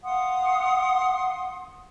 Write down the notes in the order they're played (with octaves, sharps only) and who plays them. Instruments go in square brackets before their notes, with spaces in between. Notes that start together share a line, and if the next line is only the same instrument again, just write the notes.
[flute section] F5 F#5 C6 D#6